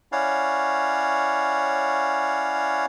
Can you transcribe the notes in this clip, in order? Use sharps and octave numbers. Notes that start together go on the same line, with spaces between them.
C#4 E4 C#5 D5 F5 F#5